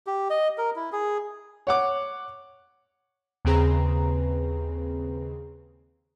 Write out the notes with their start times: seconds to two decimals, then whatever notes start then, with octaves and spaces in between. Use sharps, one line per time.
0.07 G4
0.30 D#5
0.58 A#4
0.76 E4
0.92 G#4
1.67 C#5 F#5 D6
3.45 D#2 C#3 C4 G#4 B4 A#5